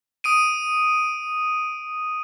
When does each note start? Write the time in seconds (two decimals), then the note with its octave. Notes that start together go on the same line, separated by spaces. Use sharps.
0.24 D#6 D7 D#7